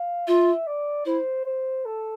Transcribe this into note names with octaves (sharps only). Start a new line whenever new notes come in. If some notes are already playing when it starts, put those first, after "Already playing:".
Already playing: F5
F4 E5
D5
E4 C5
C5
A4